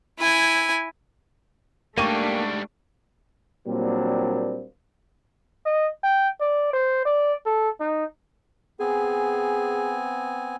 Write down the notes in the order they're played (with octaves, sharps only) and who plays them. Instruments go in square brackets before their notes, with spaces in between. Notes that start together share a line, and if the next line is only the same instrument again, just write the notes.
[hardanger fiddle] E4 G#5
[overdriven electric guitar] G#2 G3 [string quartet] A3 D4 [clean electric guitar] A#3 G4 [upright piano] C#6 D#7
[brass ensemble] A#2 F#3 G3 A#3 C4 D4
[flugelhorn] D#5
G5
D5
C5
D5
A4
D#4
[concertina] B3 C4 G#5 [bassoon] G#4